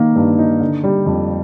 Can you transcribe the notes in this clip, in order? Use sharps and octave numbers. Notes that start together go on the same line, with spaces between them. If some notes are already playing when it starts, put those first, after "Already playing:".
Already playing: D#3 A#3
G2
D#4
D3
G3
F2